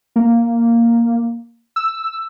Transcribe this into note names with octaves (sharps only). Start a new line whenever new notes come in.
A#3
E6